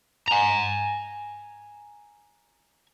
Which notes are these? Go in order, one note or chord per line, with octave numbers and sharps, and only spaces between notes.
G#5 A#5